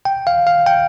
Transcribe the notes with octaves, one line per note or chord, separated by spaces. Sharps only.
G5
F5
F5
G5